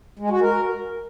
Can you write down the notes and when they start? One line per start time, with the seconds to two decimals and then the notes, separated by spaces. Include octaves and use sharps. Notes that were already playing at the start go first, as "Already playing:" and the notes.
0.19 G#3
0.30 F#4
0.41 A#4